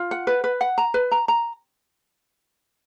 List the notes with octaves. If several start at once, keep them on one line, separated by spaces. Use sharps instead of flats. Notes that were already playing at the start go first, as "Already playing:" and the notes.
Already playing: F4
F#5
B4
B4
F#5
A#5
B4
A#5
A#5